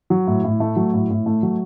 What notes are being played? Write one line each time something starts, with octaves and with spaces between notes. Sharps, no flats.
F#3
A2
A2
A3
F#3
A2
A2
A3
F#3